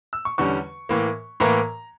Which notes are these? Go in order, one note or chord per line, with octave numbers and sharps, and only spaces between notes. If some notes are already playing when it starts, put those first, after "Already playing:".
E6
C#6
E2 D3 G3 C#4 C#6
A2 E3 A#3
A2 E3 A#3 A#5